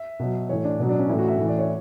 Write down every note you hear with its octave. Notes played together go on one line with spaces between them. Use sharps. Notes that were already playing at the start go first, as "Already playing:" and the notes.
Already playing: E5
B2 F#3
A2 E3 C#5
D4
B2 F#3
D4
C#4
A2 E3 E4
F#4
E5
A2 E3
D5
C#5